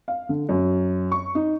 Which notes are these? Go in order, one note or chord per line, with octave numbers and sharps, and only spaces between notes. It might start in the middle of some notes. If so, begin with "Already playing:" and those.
F5
D3
F#2
C#6
D#4